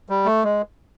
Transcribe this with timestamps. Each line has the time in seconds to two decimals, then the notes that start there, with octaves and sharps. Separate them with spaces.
0.09 G3
0.26 A3
0.44 G#3